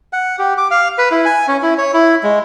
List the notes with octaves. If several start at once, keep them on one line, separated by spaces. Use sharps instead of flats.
F#5
G4
D6
F5
B4
E4
G#5
C#4
E4
C#5
E4
G#3